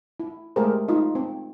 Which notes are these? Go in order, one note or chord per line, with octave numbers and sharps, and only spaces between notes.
E4
G#3 A3 G4 G#4 A#4 C5
D#4 F4
C4